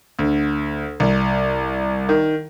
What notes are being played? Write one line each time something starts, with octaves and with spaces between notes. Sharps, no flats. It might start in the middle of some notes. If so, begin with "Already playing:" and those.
D2
C2
D#3